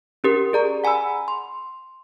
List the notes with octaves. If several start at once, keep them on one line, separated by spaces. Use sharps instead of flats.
C#4 G4 A#4
G#4 D5 A#5
F#5 G#5 A#5 B5 E6
C6